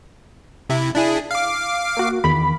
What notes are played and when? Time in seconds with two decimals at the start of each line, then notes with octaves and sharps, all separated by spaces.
0.70 C3 E4
0.95 D4 E4 G#4
1.31 F5 D6
1.97 A#3 F#4
2.24 E2 D#3 B5